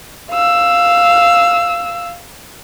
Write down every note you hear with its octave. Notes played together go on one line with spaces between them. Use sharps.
F5 E6